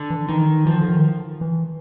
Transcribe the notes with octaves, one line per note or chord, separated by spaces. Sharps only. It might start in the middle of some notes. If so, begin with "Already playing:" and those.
Already playing: D3
E3
D#3 E3
E3 F3
D#3
D3
D#3
E3